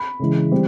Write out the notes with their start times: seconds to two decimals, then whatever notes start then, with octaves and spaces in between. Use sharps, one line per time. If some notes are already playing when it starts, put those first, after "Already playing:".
Already playing: B5
0.20 C#3 E3 G#3
0.52 E3 G3 C4